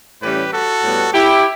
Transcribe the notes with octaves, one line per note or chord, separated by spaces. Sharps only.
A2 E3 G3 C#4 G4 B4
F#4 A4
A2 G3 B3
E4 G4